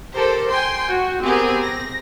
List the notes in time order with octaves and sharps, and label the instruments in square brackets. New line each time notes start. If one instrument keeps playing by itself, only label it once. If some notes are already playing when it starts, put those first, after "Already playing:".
[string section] G4 A4 A#4 C5
G5 G#5 C6
F#4
B3 C4 G4 G#4 A#4
A#6